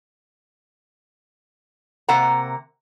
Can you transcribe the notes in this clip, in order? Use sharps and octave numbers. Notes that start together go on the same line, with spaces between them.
C3 A#3 F#5 A#5